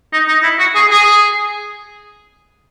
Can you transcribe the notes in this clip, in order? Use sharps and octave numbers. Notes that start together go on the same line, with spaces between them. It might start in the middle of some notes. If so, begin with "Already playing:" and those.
D#4
D#4
E4
F#4
G#4
G#4